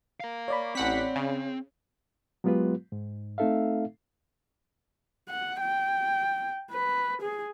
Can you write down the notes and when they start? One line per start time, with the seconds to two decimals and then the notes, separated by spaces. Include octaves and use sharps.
0.20 A#4 F5
0.48 C#5 D5 B5
0.75 A1 C4 F#5 B6
1.16 C#3
2.44 F#3 G#3 B3 F4 G4 B4
2.92 G#2
3.38 A3 C4 D#4 A4 E5 F5
5.28 F#5
5.61 G5
6.71 B4
7.22 G#4